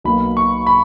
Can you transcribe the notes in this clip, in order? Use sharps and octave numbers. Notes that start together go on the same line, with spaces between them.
B1 B2 A#3 B5
C#6
B5